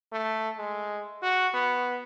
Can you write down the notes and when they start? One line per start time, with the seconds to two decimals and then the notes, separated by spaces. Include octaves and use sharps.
0.12 A3
0.57 G#3
1.22 F#4
1.54 B3